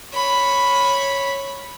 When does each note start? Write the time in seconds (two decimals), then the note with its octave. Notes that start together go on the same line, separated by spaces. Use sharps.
0.14 C#5 B5